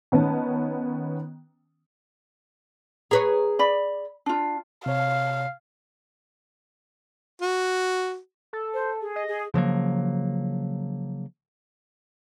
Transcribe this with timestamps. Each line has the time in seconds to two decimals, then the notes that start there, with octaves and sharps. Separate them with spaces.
0.12 D#3 B3 C#4 A5
3.11 G#4 B4 C#5 A#5
3.59 D5 B5
4.26 D4 F4
4.86 C3 C#5 F5
7.42 F#4
8.53 A4
8.74 C5
9.01 G#4
9.16 D#5
9.28 G#4
9.54 C#3 F3 F#3 A#3